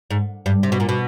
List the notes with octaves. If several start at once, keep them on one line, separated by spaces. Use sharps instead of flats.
G#2
G2
C3
B2
A#2
B2